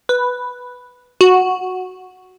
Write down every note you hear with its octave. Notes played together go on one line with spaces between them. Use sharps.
B4
F#4